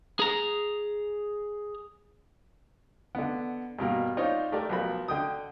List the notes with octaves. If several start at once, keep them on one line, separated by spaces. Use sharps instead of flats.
G#4 A#5
D3 B3
G2 B2 A#3
D4 D#4 F4 C5 C#5
A3 G4 A#4 D5
B1 F3 A#4 B5
D3 G5 D#6